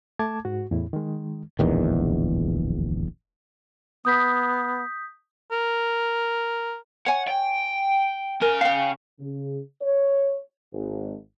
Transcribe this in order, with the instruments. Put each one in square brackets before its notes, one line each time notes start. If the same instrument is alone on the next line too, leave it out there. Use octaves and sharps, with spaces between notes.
[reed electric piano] A3 A5 D6 G#6
G#2 F#4
E2 A2 E4
D#3 G#3
[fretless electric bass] D1 A#1 E2 D#3
[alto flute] B3 [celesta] D#6 G6 B6
[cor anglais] A#4
[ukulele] C#5 G#5 [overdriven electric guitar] F#5
[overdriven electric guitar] G5
[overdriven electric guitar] C#3 G#5 [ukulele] A#4
[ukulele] F5 G5
[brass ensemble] C#3
C#5
G#1